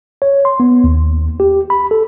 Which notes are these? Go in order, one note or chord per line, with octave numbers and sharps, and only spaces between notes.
C#5
C6
B3
D#2
G4
B5
A4